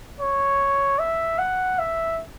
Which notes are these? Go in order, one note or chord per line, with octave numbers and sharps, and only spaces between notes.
C#5
E5
F#5
E5